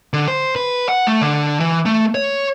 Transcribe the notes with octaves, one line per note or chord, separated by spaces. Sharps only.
D3
C5
B4
F#5
A3
D3
E3
A3
C#5